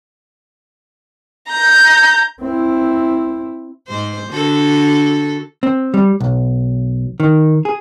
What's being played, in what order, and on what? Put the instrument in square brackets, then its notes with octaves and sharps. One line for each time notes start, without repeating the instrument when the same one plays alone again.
[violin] A#5 G6
[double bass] C4 E4
[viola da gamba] G#2 C5
D3 F#4 A4
[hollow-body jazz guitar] C4
G3
B1
D#3
G#4